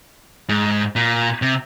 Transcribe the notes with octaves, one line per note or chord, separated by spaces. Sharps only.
G#2
A#2
C3